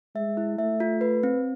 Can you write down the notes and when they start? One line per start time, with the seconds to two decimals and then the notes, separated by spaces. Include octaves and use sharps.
0.15 G#3 E5
0.37 E4
0.58 A3 E5
0.80 F4
1.01 B4
1.23 C4